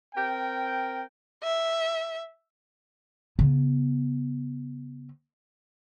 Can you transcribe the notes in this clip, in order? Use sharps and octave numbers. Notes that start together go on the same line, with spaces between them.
C4 A#4 G5
E5
C#3 B3